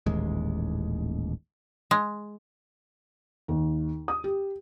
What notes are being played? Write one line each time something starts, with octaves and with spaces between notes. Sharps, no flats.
D#1 A1 D#2 G#3
G#3
D#2
D#6
G4